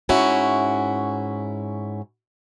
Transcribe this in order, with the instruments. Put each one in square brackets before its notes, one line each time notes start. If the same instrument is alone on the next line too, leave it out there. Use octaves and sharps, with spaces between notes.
[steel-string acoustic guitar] G#2 C#4 E4 F#4